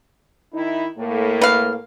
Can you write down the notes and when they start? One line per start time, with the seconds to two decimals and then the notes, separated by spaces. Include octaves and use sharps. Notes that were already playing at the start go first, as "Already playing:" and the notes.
0.53 D#3 D#4 E4
0.98 A2 A#3
1.41 B4 F5